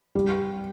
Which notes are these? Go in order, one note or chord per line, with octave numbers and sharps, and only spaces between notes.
G3